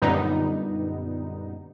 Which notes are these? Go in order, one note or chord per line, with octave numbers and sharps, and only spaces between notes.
F#2 A#2 D3 G3 B3 D#4